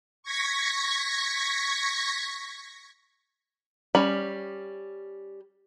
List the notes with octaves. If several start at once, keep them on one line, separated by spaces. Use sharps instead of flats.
C#6 G#6 A#6 B6 C#7
G3 C#4 B5